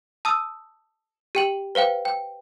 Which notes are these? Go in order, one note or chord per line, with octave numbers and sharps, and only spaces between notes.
A5 D#6 E6
G4 G5 F#7
B4 C5 F5 G5
G5